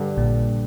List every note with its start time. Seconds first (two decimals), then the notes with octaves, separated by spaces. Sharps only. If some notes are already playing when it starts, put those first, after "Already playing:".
Already playing: G2 D3 G3
0.17 A#1 A#2